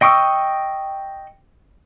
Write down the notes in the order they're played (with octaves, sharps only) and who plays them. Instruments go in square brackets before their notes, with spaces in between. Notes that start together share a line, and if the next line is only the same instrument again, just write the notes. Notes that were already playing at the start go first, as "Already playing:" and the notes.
[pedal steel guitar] D#5 G5 C#6 D#6 E6